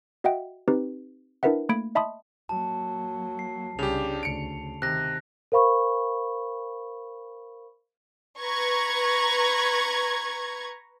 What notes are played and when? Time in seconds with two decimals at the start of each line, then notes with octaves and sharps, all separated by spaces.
0.24 F#4 D#5 E5 F#5 G5
0.68 C4 D#4 G4 B4
1.43 D4 E4 A#4 B4 E5 F#5
1.69 A3 A#3 B5 G#6 D7
1.95 D#5 E5 A5 B5 C6 D#6
2.49 F#3 A#3 A5
3.39 C7
3.79 C2 C#3 D4 G4 F7
4.23 D2 C#3 C#7 D7
4.82 C3 D#3 F#6 A#6
5.52 A#4 C5 F5 B5 C#6
8.39 B4 A#5 C#6 G#6